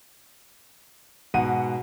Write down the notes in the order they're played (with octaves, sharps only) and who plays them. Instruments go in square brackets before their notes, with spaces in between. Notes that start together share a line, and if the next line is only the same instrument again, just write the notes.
[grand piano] G#2 B2 D#7 [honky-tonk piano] F#5